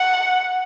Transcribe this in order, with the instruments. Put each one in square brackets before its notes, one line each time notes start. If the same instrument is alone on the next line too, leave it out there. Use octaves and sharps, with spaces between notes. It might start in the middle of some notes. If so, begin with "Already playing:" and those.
Already playing: [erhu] F#5